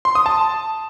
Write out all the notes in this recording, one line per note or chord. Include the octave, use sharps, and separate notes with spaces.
C6
D#6
A5